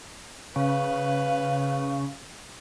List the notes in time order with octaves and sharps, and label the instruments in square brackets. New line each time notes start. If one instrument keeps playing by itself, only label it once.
[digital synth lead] C#3 [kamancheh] B4 F5